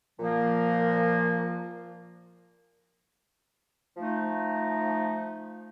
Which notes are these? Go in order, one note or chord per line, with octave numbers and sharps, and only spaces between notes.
A#2 F3 A#3
F3 A3 D#4